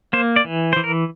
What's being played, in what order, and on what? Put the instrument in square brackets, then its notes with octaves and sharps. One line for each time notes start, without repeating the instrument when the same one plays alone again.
[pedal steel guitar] A#3 C5
D5
E3
E3 C5
A#4